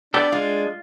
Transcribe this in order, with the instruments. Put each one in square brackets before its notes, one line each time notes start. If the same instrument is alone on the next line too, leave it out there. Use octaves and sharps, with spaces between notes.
[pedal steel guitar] B3 G4 A4 [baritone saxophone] D4 [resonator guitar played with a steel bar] D5
[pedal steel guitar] G#3 [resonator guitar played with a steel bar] F4